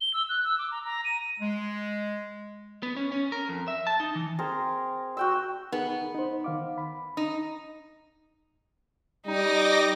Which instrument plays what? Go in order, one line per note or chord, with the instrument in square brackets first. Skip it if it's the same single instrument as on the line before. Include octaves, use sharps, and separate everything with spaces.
[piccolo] G7
E6
F#6
E6
D6
A#5
A#5
D#7
[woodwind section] G#3
[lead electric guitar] B3
C#4
C#4
A#4
F2
E5
A5
D#4
E3
[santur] C4 G#4 A#4 A#5
F#4 G5 E6
[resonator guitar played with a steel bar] B3 [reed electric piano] D#4 G#4 A#4
[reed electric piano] D#4 C5
D#3 F5 D6
B5
[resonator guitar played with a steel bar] D#4
[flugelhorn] G3 [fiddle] D#4 [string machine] D#5 D6 A#6